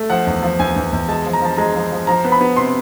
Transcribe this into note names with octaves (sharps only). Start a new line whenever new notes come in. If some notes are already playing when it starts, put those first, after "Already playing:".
Already playing: A3
F3 F#5
E2
F3
E2 G#5
E2
E2
G#3 A5
F3
A#5
F3 A5
G#3 A#5
F3
F3
F3 A#5
B3
B5
B3
C3 C6